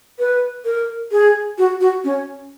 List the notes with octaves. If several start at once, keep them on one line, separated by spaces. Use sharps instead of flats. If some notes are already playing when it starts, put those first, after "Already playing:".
B4
A#4
G#4
F#4
F#4
C#4